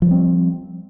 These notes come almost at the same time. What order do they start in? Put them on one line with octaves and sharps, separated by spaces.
F3 G3 C4